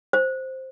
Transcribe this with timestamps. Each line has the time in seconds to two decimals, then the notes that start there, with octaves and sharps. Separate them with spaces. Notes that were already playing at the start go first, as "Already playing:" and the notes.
0.13 C5